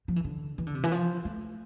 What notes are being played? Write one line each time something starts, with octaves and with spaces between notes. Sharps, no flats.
F3
E3
D3
E3
D3
C3
E3
F3
A3